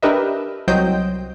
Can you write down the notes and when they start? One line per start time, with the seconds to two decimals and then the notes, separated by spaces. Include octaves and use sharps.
0.03 D4 G4 A#4 B4 D#5 E5
0.68 C2 F#3 C5 D#5 G5 G6